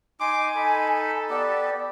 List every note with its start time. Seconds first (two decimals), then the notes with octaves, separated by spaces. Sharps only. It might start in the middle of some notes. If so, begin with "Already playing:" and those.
0.20 D#4 G#5 C6 D6
0.56 D#4 A4 B5
1.30 B3 G4 D5